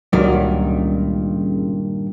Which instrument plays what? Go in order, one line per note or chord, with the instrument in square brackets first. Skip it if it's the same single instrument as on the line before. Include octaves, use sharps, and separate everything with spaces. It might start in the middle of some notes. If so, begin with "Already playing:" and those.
[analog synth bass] C#2 [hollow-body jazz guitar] G2 A#2 D#3 [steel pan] F#3